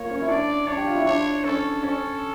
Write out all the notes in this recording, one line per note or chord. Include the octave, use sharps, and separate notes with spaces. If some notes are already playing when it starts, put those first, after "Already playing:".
Already playing: A#3 F4 C#5
C#4
E4
D4 D5
D4 C#5
G4
F4
E4
D4 C#5
C#4 A4
C#4